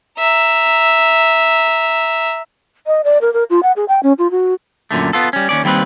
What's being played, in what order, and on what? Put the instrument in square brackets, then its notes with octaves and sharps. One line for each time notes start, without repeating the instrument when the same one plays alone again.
[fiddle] E5 A#5
[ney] D#5
D5
A#4
A#4
F4
F#5
G#4
G5
C#4
F4
F#4
[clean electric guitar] F#2 A#2 D3 A3
B3 F4 A4
G3 C#4
D#2 C#4 D5
D#2 G3 C4 B4